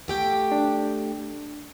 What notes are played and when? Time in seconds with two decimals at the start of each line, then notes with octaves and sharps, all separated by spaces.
0.08 A3 G4 G5
0.52 D4